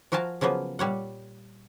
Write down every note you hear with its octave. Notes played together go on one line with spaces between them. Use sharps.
F3 F#4 A#4 G#5 A5
C#3 F3 F#3 A#3 B3
A#2 G3 C#5 F#5